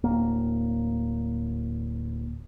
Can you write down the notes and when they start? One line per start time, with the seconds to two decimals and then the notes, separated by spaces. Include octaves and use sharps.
0.04 D1 A#3